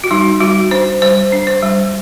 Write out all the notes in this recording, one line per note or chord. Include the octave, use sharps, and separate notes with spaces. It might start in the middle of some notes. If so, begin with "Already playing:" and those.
F#4
G3 D#4
G3 F#4
D4 C5
G3 C5
D4
C5
G3